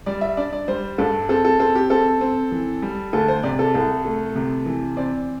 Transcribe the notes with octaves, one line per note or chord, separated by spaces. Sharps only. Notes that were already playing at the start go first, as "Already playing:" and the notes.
G3 D5
E5
D4 D5
D5
G3 C5
G2 A4
C4 A4
A4
C4 A4
G4
C4 A4
C4
E3
G3
D2 A4
C5
C3 D5
A4
C2 A4
A3
C3
E3
C4 D5